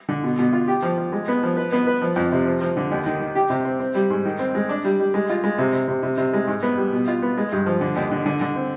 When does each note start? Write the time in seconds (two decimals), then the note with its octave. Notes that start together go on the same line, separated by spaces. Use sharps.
0.09 D3
0.24 B2
0.39 B2
0.53 F4
0.68 G4
0.82 F3
0.98 F3
1.12 G#3
1.28 B3
1.43 F3
1.57 B4
1.72 B3
1.87 B4
2.02 F3
2.16 F2
2.32 C3
2.46 F3
2.61 F3
2.77 D3
2.91 D#2
3.06 D#3
3.20 D#3
3.35 G4
3.50 C3
3.65 C4
3.80 C4
3.95 G3
4.10 G#2
4.25 D#3
4.39 C4
4.55 G#3
4.69 D4
4.84 G3
4.99 G3
5.14 G#3
5.29 F4
5.44 G#3
5.58 C3
5.73 C3
5.88 C3
6.03 C3
6.17 C3
6.33 G#3
6.47 G#2
6.63 B3
6.77 G3
6.92 B2
7.08 F4
7.22 B3
7.37 G#3
7.52 G2
7.66 F3
7.81 D3
7.96 D#2
8.11 D3
8.26 D3
8.41 D3
8.55 C4